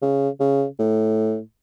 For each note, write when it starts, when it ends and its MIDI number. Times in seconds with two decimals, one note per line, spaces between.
0.02 0.29 49
0.40 0.65 49
0.79 1.39 45